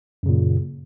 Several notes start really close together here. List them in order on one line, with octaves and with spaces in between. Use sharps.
F#2 C#3 A#2